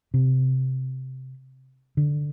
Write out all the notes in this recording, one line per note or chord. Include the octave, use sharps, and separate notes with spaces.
C3
D3